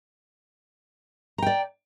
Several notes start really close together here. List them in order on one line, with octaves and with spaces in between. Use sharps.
A#5 G5 D5